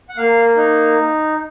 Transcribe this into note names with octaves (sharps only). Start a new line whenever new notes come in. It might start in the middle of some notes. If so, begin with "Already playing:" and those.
F#5
A#3 F5
D#4